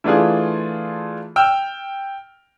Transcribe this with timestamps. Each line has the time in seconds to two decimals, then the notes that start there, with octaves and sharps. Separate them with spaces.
0.04 E3 A3 D4 F4 G#4
1.36 G5 E6 F6